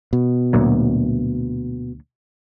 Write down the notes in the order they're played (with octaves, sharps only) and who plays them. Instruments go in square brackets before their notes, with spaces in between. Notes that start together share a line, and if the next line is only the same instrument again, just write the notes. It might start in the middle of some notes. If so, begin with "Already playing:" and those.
[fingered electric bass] B2
[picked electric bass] D2 A#2 F#3